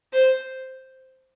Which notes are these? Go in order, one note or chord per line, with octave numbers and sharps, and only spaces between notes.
C5